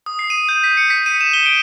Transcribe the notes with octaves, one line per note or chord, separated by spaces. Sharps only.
D#6
C7
D#7
G6
B6
C#7
B6
D#7
E7
G7
D7